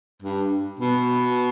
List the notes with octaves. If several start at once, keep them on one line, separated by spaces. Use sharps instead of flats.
G2
B2